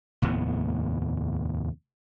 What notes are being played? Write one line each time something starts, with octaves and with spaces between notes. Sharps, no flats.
F1 D#2 A2 B3